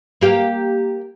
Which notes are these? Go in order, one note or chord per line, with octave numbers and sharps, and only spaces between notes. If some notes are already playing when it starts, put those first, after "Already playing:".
A#3 G4 F5